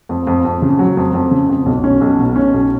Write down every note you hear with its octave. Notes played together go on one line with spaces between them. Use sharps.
F2
F2
F2
C#3
F#3
F2
F2
C#3
F2
B1
C#4
B1
B2
C#4
B1